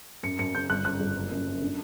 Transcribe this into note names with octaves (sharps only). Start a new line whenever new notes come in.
F#2 C#7
F#2 C#7
C#3 G6
G1 F#6
F#2 F#6
G1
F#1
F#2
F#2
D3